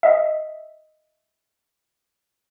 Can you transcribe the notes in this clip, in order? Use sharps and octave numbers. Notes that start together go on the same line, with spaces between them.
D#5 E5